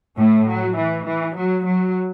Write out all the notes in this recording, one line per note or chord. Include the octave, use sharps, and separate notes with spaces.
A2 A3
F#3
E3
E3
F#3
F#3